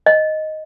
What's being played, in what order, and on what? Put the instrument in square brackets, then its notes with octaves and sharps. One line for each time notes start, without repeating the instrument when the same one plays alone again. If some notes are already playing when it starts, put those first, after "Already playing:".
[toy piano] D#5